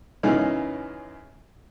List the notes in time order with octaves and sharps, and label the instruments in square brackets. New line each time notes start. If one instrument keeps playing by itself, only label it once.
[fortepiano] F#2 C#3 E3 B3 D#4 F4